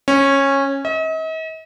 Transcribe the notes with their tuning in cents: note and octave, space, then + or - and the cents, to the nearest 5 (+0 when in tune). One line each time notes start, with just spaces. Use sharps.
C#4 -15
D#5 +45